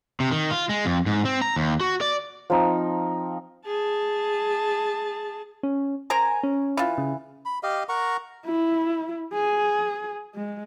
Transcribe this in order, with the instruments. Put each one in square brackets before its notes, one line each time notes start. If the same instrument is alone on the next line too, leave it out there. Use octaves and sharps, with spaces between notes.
[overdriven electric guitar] C3
D#3
F4
G#3
F2
G#2
C4
A#5
D#2
F#4
D5
[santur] F3 C4 D#4
[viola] G#4 A5
[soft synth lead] C#4
[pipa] A#4 C5 A#5 [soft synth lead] G#5
[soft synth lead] C#4
[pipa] E3 F4
[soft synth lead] C#3
[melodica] B5
G4 D#5 F5
A#4 F#5 A#5 C#6
[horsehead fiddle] E4
G#4
G#3